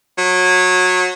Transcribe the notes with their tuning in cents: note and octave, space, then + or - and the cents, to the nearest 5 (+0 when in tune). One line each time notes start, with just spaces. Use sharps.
F#3 -20